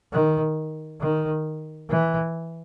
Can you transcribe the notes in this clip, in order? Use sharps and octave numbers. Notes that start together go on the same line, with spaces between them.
D#3
D#3
E3